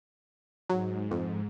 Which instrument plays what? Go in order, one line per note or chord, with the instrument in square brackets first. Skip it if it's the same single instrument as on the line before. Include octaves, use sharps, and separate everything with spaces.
[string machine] G#2 [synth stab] F#3
[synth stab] F2